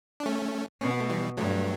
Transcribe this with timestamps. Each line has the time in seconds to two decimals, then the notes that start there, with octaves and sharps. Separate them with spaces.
0.20 D4
0.26 A3 C#4
0.81 B2 C#4
0.91 B3
1.00 A3
1.10 E3 G3
1.37 G2 F#3 A3